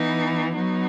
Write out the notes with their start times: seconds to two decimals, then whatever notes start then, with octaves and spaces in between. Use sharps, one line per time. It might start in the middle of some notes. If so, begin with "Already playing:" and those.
Already playing: E3 B3 D#4
0.55 F#3 B3 D#4